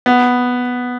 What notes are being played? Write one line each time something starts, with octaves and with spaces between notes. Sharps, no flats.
B3